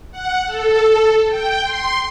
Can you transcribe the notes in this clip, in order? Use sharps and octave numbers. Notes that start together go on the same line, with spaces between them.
F#5
A4
G5
C6